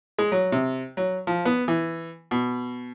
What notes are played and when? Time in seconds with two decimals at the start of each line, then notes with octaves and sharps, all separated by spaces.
0.19 G#3
0.32 F#3
0.52 C3
0.97 F#3
1.27 F3
1.45 B3
1.68 E3
2.31 B2